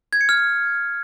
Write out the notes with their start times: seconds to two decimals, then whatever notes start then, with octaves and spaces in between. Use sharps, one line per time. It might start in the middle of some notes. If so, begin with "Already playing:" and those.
0.13 G#6
0.21 C#7
0.29 F6